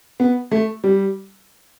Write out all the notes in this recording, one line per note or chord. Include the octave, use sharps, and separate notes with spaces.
B3
A3
G3